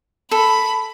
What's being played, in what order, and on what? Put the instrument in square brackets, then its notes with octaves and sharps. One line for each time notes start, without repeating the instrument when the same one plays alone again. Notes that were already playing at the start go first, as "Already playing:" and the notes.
[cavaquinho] A4 [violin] B5